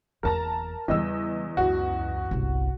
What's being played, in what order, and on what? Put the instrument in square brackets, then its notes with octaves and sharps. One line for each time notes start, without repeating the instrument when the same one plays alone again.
[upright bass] F#1 E2 [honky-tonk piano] A#4 A5 A#5
[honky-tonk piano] E2 D#5 E6 [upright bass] C#3 G3
[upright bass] C#2 F#2 [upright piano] F#4
[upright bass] G1 C2